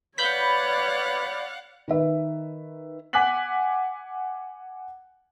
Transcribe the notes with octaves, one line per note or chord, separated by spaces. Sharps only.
B4 C#5 D5 F5 F#5 B5 G6 B6
D#3 B4 E5
F#5 G#5 D6 F#6 B6 F#7